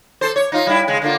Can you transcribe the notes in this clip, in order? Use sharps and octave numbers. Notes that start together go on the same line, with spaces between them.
A4 C5
C#5
D#4 F4
G3 E4
C#3 G#3
D3 A#3 F4